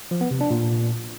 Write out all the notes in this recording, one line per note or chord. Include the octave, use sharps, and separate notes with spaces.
F3
B3
C3
D4
A#2